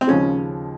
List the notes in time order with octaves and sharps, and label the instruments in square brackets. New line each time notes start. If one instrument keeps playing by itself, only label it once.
[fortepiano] C4
[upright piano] D#2 C#3 F3 G#3 [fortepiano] C#4